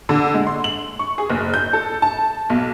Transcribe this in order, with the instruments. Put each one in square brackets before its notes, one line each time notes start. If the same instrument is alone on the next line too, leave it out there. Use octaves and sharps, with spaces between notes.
[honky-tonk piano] D3
G#3
C6
F#7
C#6
G#4
F#1
G6
A4
A5
B1